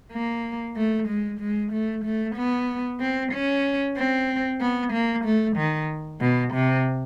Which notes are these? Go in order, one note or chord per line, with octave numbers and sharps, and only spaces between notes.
A#3
A3
G#3
G#3
A3
A3
B3
C4
C#4
C4
B3
A#3
A3
D#3
B2
C3